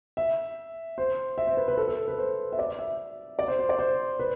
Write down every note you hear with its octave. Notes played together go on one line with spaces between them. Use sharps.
E5
C5
E5
C5
B4
B4
A4
A4
B4
C5
E5
D5
E5
D5
C5
C5
D5
C5
B4